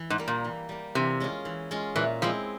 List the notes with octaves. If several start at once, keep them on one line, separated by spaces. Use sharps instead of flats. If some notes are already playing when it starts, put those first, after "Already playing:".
Already playing: E3
G#2
G3 A#3
A#2
E3
G3 A#3
C3 E3
G#3 C#4 F4
E3
G#3 C#4 F4
A#2 E3
F3 G#3 C4 E4